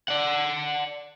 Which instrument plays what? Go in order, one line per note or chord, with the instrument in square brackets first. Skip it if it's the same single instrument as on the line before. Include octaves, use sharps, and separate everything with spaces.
[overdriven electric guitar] D5 F#5